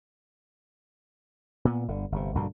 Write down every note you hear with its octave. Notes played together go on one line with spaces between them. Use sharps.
A#2 B3
G1 D3
G1 C3
A#1 G2 B2 D3